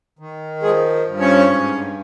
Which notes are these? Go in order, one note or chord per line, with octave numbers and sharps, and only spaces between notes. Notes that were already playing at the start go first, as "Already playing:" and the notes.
D#3
F3 G#3 G#4
G2
C#4 C#5
G#2